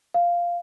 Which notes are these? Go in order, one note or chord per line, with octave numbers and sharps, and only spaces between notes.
F5